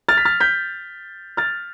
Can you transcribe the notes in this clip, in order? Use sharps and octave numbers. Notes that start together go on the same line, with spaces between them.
F6 A6
B6
F6 A6
G6 B6
F6 A6